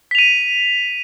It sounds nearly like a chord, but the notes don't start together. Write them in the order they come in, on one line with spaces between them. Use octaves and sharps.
B6 F7 D#7